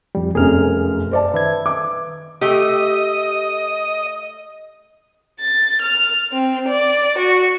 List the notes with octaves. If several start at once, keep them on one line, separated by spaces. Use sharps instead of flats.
F2 G3
F1 F#2 G#4 A#4 F6
C5 D5 A5
D#3 B4 E5 G#6
D6
A3 G4 D#5
A6
F6
C4
D5
F#4